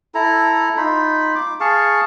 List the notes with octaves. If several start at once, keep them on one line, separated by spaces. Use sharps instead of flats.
E4 A4 A#5
D#4 F4 B5
D6
G#4 F5 A5 C#6